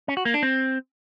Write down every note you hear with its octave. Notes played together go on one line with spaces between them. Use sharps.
C#4
F#4
A#3
D4
C4